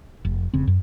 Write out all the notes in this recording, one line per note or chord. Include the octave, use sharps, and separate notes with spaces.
F1
F1 C#3 C4
F#2